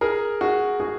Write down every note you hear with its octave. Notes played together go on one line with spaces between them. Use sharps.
G#4 A#4
F#4 G#4
F#4 G#4